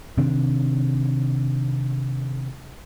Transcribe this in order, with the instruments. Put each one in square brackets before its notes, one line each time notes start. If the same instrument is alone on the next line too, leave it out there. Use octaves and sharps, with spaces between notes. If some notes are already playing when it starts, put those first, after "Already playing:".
[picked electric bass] C3 D#3 C4 D4